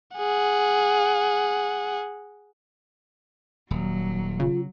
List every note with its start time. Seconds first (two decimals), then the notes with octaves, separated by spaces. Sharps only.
0.17 G#4 F#5
3.71 D#1 F#3
4.40 C#3 F4